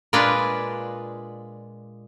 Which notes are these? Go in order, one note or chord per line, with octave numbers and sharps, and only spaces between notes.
A#2 G#3 D4 F4 B4 D5